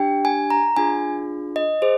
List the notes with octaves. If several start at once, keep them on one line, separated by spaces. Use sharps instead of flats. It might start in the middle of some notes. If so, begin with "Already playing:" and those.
Already playing: D4 G4 G5
G#5
A#5
D4 F4 G#4 G#5
D#5
G#4 C5